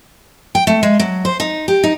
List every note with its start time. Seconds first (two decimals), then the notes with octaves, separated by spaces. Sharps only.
0.55 G5
0.67 A3
0.83 G#3
0.99 F#3
1.25 C5
1.40 D#4
1.68 G4
1.84 D#4